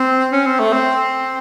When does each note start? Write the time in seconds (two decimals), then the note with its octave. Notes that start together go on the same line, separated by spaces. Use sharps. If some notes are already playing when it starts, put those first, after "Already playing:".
Already playing: C4
0.33 C#4
0.47 C4
0.60 A3
0.73 C4